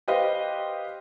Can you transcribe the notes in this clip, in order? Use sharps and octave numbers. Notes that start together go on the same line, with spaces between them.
G4 B4 C5 D#5 F5